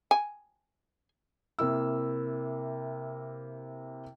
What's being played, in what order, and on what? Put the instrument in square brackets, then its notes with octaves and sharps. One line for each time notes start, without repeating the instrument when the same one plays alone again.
[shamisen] G#5
[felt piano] C3 A#3 E4 E6